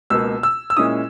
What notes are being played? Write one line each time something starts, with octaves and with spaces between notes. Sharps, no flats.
C#2 B2 A#3 E6
E6
E6
A#2 G#3 C#4 E4 D#6